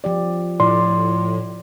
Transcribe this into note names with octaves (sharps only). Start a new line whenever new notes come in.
F3 G4 D5
A2 F3 D5 C6